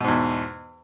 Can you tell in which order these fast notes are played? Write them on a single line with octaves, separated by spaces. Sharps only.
B2 G#2 E2